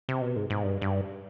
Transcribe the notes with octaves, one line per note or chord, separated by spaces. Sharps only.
C3
B2
G#2
G#2
G2
G2